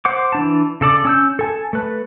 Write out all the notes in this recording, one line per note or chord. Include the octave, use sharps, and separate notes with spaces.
C5 F#5 D6
E3 D4 A5
C#3 A4 D5 D6
C#4 E6 G6
A4 G#5 A5
A3 B4